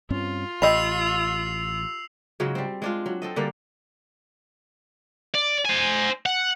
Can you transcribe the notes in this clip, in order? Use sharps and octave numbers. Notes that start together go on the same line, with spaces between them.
G2 C4 C#4 F4
A1 G4 D#5 B5 E6 C7 F7
G#2 C#3 F#3 G#3
G3 C4
G#3 D4 F4
F#3
C4 A4 D#5
D3 G3 A#3
D5
C5 G#5
F#5